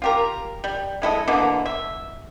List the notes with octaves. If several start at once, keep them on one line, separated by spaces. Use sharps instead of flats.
F4 G4 A#4
G3
G#3 E4 A4 D#5
B2 D3 E3 A#3
E5